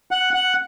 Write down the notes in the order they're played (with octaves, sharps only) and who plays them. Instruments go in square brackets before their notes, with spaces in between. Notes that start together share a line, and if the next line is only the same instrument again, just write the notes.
[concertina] F#5
F#5